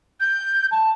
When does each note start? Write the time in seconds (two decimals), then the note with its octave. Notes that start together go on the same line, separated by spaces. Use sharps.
0.21 G6
0.71 A5